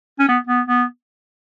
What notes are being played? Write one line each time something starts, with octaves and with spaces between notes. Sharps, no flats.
C#4
B3
B3
B3